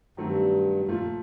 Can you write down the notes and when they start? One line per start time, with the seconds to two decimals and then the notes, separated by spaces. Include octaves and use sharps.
0.17 G2 D#3 F#3 A3 C4
0.88 F2 A#2 F3 A3
0.95 F#2